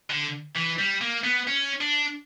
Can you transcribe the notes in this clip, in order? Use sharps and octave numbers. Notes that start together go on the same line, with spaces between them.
D3
E3
G3
A#3
B3
C#4
D4